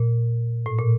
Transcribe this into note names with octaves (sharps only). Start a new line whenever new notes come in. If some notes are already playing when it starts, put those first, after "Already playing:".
Already playing: A#2
A2
A#2